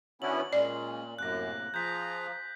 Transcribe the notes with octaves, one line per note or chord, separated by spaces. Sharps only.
D#3 B3 C#4 D4 E4 F#4 F#7
A#2 G#3 C#4 D5
F#2 A2 C3 A#3 F#6 A#6
F3 F4 G#4 A#5 G6 B6